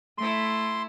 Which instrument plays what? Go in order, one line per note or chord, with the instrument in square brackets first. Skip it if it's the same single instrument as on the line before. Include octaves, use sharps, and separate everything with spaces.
[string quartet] A3 E4 [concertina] C6